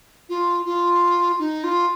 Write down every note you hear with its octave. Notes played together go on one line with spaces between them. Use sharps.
F4
F4
D#4
F4